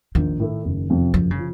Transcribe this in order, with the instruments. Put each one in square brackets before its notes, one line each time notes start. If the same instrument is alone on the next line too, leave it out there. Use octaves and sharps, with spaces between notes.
[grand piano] A#1 [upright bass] D#3
[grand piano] A2 A3
F#1
F2 C3 F3
[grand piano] F#1 [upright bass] F3
[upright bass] C#3
[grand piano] F3